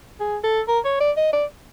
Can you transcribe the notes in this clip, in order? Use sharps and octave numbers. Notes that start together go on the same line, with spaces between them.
G#4
A4
A#4
C#5
D5
D#5
D5